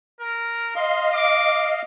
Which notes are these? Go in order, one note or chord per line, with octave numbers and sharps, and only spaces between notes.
A#4
D#5 F5 C6
D6